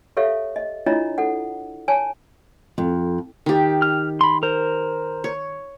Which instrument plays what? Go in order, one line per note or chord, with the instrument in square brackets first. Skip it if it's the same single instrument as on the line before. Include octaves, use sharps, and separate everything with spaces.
[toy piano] G4 A4 C#5 E5 F5
D#5
D4 E4 F4 C#5 D#5 A#5
A4 F#5
C#5 G#5 A5
[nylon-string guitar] F2
[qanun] D#3 G4
[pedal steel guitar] F6
B5 C6
A#4 C5
[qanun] C#5